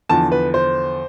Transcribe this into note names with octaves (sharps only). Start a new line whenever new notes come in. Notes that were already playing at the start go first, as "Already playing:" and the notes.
E2 D3 F3 A5
B4
C5